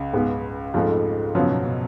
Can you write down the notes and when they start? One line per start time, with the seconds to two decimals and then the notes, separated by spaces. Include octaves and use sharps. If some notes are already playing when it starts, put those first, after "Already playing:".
Already playing: C#2 C#3
0.13 G#2 G#3 B3
0.74 F2 G#2 F3 G#3 A3
1.35 F#2 C#3 F3 F#3 B3
1.51 B2
1.65 B2